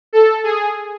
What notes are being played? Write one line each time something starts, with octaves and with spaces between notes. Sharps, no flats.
A4
G#4